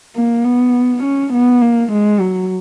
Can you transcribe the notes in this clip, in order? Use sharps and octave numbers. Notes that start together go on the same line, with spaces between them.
A#3
B3
C#4
B3
A#3
G#3
F#3